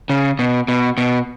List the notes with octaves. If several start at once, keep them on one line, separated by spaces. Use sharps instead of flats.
C#3
B2
B2
B2